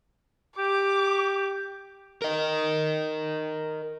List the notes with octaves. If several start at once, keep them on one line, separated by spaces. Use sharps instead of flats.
G4 D6
A#4 D#5